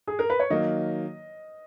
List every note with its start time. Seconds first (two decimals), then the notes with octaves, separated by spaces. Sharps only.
0.07 G#4
0.19 A#4
0.30 B4
0.40 C#5
0.50 D#3 F#3 A#3 D#5